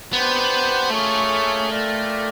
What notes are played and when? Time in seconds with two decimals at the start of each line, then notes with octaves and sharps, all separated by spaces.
0.13 B3 D4 G4 C5
0.90 A3 A#3 C#4 F4 G#4 C#5
1.68 F4 A#4 D5 G5